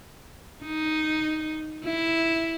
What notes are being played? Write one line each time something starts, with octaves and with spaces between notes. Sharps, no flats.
D#4
E4